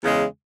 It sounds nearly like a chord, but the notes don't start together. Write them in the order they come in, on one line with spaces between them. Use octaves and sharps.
E2 C#3 G#3